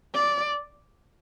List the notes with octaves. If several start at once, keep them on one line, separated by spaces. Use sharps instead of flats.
D5